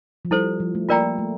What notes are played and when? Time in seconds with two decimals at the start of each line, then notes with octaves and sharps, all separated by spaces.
0.25 F3
0.31 G3 E4 A4 C5
0.60 F3
0.75 A3
0.89 A#3 F4 A#4 D5 G5 A#5
1.18 A3